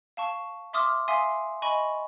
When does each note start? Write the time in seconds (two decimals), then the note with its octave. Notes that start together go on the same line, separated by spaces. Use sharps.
0.17 F5 A5 C#6
0.73 E5 C6 D6 D#6 F6
1.08 E5 F5 G#5 C6 D#6
1.62 D#5 G#5 B5 C#6